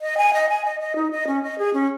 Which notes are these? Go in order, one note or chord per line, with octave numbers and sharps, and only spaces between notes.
D#5
G#5
D#5
G#5
D#5
D#5
D#4
D#5
C#4
D#5
G#4
C#4